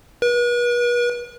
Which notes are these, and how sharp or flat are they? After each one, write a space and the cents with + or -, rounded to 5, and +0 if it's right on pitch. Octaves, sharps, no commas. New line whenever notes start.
B4 -40